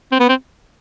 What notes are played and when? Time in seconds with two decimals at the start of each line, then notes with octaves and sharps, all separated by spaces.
0.12 C4
0.20 B3
0.29 C4